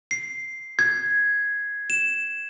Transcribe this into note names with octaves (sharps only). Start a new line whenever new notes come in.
C7
G#6
E7